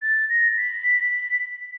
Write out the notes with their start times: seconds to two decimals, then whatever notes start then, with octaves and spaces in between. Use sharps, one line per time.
0.02 A6
0.30 A#6
0.57 B6